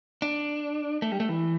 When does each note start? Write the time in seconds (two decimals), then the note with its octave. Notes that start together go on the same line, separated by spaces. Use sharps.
0.22 D4
1.02 A3
1.12 G3
1.20 A3
1.29 E3